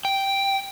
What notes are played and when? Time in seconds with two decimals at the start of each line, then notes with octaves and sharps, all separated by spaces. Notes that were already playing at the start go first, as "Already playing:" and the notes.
0.05 G5